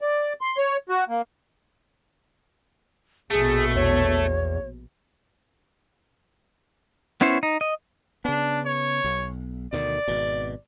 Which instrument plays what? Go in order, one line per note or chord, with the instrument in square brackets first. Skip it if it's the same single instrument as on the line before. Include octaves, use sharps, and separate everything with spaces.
[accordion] D5
C6
C#5
F#4
A#3
[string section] A#1 B2 [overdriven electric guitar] A3 [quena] G#4
[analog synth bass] E2 [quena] C#5
[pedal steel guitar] B3 C#4 E4 C5 C#5
D#4
D#5
[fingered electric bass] C#3 B3 [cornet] D4
[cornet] C#5
[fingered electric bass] B1
[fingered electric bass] D2 B2 D#3 [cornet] D5
[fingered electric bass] G#1 B2